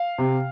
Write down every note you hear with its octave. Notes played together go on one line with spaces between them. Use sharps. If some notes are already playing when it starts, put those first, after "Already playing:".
Already playing: F5
C3